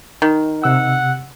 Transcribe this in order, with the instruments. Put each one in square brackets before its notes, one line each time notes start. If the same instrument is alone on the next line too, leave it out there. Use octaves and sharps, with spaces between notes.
[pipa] D#3
[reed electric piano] C3 E6 [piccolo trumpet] F#5